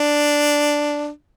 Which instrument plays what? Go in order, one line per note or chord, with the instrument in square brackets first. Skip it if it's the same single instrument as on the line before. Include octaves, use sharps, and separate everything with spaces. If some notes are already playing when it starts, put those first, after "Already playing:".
Already playing: [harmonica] D4